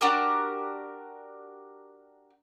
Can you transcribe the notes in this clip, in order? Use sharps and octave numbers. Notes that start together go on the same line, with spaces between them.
D4 F#4 G4 A#4